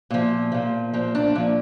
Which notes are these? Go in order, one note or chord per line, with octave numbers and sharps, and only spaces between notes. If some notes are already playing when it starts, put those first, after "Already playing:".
A#2 F3
A#2 F3
A#2 F3
D4
A#2 F3